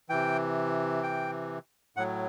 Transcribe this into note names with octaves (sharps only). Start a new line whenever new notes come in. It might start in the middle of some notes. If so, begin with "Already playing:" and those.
C3 E3 G5
G5
A2 F#3 F#5